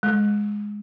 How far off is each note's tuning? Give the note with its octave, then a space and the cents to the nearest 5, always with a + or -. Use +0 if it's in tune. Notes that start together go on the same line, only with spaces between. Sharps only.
G#3 +0